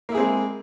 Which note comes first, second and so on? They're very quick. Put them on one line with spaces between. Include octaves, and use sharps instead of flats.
A#3 E4 G#4 C4 G#3